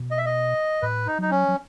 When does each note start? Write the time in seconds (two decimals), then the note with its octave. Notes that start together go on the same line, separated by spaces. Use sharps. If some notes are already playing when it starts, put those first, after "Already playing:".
Already playing: B2
0.11 D#5
0.18 E5
0.26 D#5
0.82 A2 B4
1.07 D#4
1.19 F#3 D#4
1.31 C#4
1.48 F#3